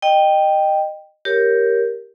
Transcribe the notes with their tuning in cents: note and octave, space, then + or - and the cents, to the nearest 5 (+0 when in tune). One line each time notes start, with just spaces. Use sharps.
D#5 -20 G5 +0
G4 +0 A#4 +0 C#5 +0